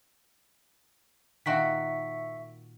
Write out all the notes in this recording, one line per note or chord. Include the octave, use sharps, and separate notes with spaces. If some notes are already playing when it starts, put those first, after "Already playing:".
A#2 D#3 F#4 E5 C#6 B6